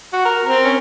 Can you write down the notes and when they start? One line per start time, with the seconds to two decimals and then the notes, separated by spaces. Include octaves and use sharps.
0.13 F#4
0.25 A#4
0.45 C4 A#4
0.65 C#4